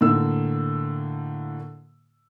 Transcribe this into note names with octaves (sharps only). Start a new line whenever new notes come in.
A2 D3 A#3 E6